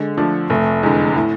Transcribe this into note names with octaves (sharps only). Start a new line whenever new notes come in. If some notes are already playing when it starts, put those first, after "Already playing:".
Already playing: D3 G#3
F3 A3 D4
F1 A3
E2 D3 G#3
A2